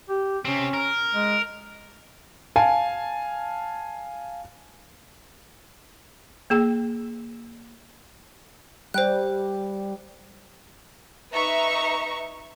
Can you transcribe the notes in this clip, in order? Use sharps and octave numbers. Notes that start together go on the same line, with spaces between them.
G4
C3 C4 C#4
A#4
G#3
F5 G#5 A5
A#3 G#4 G5
G3 C5 G5 F#6
D#4 B4 E5 A#5 C#6